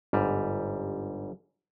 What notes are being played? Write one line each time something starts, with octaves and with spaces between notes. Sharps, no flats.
G1 G#2 G3